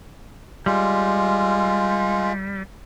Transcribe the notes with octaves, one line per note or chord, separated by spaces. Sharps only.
G3 G#3 F4